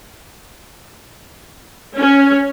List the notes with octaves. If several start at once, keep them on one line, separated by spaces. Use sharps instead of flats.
C#4